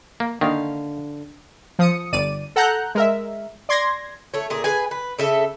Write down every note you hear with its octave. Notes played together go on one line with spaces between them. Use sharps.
A#3
D3 D#3 A#3 F5
F3 D#6 C#7
G1 D5 D#7
A4 F#5 A#5 F#6 G6
G#3 A#4 E5
D5 C6 G#6 A#6
A3 C#5
A#2 G#4
G#4 B4 G#5
B4
C#3 A4 E5